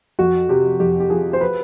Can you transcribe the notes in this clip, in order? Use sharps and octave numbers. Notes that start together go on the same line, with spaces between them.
F2 F#4
C3 G4
F2 G4
G4
F3 G#4
C5
B4